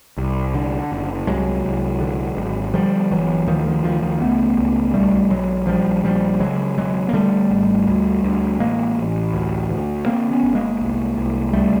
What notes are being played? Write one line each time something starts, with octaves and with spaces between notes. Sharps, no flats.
C2
D3
F#1
C2 F#3 G#3
C2
D3
G#1
D3 F3 G3
G1 E3 F#3
D2 D#3 F3
D#3 F3
D2 D#3 F3
D#3 F3
C#2 A3 B3
C#2
B1 G3 A3
B1 F#3 G#3
A#1 F3 G3
A#1 F3 G3
C#3 F#3 G#3
E1 F#3 G#3
A#3
D3 G3 A3
G#1
D2
D2
A1 G#3 A#3
A1
D2
D2
D3 A#3 C4
B3 C#4
G1
G#3 A#3
C2
C2
C#2 G3 A3